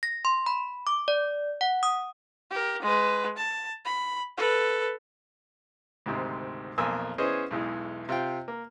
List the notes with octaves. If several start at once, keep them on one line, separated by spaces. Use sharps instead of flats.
A#6
C6
B5
D6
D5
F#5
D#6
G4 A#4
G#3 B4
A5
B5
A4 B4
D2 G#2 C3 D#3
B1 F2 A#3 G#5 C6 E6
E3 B3 C#4 G#4 C5 D#5
B1 E2 E3 G#3
C3 F4 G5
A#3